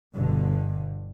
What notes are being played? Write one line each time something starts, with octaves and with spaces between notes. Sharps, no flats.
G1 G2 B2 D3